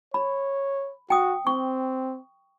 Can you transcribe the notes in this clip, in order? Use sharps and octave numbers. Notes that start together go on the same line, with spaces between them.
C#5 B5
F#4 G5 D#6
C4 C#6